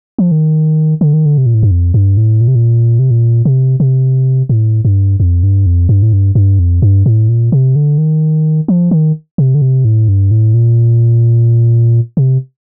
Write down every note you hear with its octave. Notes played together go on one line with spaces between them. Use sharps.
F3
D#3
D3
D#3
D3
C3
A#2
A2
G2
F2
G2
A2
A#2
C3
A#2
C3
A#2
C3
C3
A2
G2
F2
G2
F2
G2
A2
G2
G2
F2
G2
A2
A#2
C3
D3
D#3
F3
D#3
C3
D3
C3
A2
G2
A2
A#2
C3